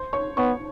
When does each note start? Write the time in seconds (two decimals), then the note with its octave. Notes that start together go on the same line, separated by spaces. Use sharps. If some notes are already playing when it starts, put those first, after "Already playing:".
Already playing: C5 C6
0.13 C#5 C#6
0.37 B3 C#5 C#6